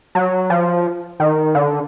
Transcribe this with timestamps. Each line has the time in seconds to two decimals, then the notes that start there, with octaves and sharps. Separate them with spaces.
0.15 F#3
0.50 F3
1.20 D#3
1.55 D3